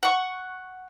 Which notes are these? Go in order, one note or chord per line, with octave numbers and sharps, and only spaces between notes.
F#5 C#6